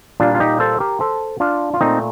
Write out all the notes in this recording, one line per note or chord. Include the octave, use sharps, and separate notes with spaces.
A#2 G3 A#3 D4 F4
F4
D#4 G4
A4 C5
G4 A#4
A4 C5
D4 F4
F4
A#2 A3 C4 D#4